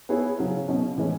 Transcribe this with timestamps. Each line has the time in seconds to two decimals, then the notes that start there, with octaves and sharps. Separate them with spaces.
0.09 B3 E4 G#4 C#5
0.39 C#3 F#3 C#4
0.68 B2 F#3 C#4
0.98 A2 E3 G#3 C#4